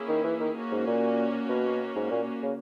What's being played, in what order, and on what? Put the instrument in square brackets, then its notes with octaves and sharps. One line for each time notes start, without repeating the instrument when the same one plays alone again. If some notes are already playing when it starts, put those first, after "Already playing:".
Already playing: [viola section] A#3 C#4 E4 G#4
[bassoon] D#3
E3
D#3
[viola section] A#3 C#4 F#4
[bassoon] G#2
A#2
B2
G#2
A#2
C#3